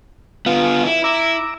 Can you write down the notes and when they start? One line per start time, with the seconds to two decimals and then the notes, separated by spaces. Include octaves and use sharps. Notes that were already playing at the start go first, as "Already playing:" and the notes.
0.46 D3 B3 F4 F5
0.86 E4
1.04 E4 A#5 D6 E6